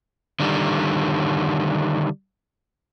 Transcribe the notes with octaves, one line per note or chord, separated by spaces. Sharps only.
D3 D#3 G3